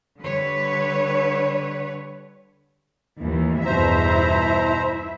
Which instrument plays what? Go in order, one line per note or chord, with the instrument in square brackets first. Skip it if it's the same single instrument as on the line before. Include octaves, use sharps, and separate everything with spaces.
[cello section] D3 G3 B4 C#5
D#2 E3
[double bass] E2 G2 [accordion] B2 C5 A#5 [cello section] E4 E5